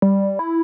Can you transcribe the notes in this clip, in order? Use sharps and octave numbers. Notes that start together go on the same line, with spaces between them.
G3
E4